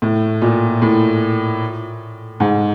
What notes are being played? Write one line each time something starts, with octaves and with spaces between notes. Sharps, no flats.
A2
A#2
A2
G#2